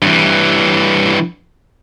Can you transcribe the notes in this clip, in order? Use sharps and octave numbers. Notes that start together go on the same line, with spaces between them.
G2 E3